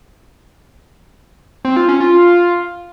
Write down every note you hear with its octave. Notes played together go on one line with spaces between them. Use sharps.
C4
F4
C#4
F4